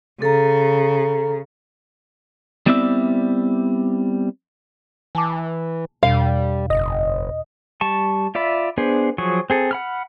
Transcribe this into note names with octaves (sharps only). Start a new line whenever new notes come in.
C#3 A4 A#5
G3 B3 C4 E4 D5 E5
E3 G#5 A5 D6
E2 B2 G3 F5
F#1 D#5
G3 A5 C#6
F4 D5 E5 B5
B3 D4 G#4 C5
F3 F#3 G#4 C#6
C4 G#4 A4
F#5 B5 F6